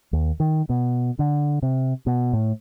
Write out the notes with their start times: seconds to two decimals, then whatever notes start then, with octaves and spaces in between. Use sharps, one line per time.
0.13 D#2
0.40 D#3
0.69 B2
1.19 D3
1.62 C3
2.07 B2
2.33 A2